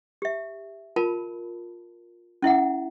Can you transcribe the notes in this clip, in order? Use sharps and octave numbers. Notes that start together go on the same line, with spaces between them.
G4 E5
F4 A#4 A5 B5
C#4 E4 E5 F#5